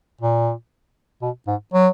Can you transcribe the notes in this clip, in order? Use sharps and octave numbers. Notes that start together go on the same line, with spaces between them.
A#2
B2
G#2
F#3